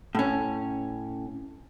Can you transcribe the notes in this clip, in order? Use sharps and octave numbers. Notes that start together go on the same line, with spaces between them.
A2 C#4